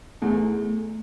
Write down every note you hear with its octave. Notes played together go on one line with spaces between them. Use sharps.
E2 A3